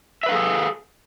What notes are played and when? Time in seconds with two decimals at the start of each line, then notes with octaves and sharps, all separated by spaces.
0.23 E5
0.26 B4
0.29 F5
0.32 A4
0.34 G#4